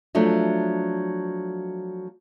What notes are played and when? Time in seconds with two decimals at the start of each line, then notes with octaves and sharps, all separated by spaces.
0.15 F3 F#3 A3 D4